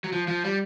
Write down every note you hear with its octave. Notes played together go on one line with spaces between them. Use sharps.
F#3
F3
F3
G3